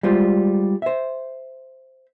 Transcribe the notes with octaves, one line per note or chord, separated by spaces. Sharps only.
G3 G#3 F4 C5
C5 E5